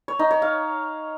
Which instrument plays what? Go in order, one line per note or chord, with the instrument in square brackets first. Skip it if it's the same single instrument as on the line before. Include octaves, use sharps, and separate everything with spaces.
[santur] C#5
D#4
C#5
F5